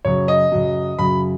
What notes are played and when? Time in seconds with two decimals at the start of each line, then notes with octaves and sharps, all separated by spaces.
0.05 F#2 C#3 F#3 C#5
0.28 D#5
0.52 F#2 C#3 F#3
0.99 F#2 C#3 F#3 B5